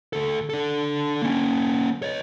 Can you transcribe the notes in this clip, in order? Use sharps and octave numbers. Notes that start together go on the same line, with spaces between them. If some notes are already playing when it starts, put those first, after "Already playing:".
D2 A4
D4 A4
A#3 C#4
C#5 D#5